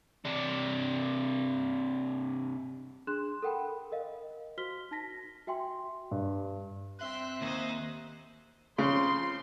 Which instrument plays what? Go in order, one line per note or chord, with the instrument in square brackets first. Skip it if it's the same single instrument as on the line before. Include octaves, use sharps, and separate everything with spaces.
[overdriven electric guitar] C3 D4
[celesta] D4 G#4 C6 F#6 E7
A4 A#4 F#5 G5 B5
A#4 D#5 F5
F#4 C5 F6 B6 G7
D#4 A5 A#6 B6
F#4 E5 G5 G#5 C6
[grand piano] G2
[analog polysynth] C4 E5 F#6 [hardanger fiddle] C6
[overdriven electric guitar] D#2 [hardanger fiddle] D#4 C5
[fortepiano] C#3 [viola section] F3 C6